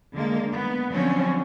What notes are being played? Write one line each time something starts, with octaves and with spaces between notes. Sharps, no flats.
D3 G#3 A#3
B3
D3 F3 F#3 C4 C#4